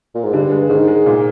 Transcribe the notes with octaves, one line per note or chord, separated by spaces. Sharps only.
A#2
G#2
G2 D3
G#3
G#2 D#3
G#3
A#2